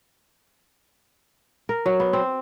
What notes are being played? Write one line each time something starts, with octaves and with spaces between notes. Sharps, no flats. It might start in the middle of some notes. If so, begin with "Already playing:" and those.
A#4
F#3
B3
C4